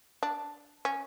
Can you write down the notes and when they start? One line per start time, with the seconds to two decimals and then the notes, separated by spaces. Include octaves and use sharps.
0.23 D4
0.85 C#4